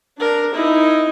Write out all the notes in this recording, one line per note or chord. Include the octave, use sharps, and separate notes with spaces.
D4 A#4
D#4 E4